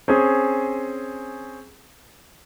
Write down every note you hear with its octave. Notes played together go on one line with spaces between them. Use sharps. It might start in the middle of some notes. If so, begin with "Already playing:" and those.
C4 C#4 G#4